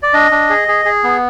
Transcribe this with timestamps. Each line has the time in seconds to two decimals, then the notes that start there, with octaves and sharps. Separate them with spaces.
0.03 D5
0.14 D4 D#5
0.31 D4
0.50 G#4
0.68 G#4
0.85 G#4
1.04 B3